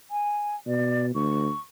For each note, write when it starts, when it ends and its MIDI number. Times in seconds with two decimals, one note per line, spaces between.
0.11 0.55 80
0.67 1.10 47
0.67 1.06 74
1.15 1.49 38
1.15 1.61 85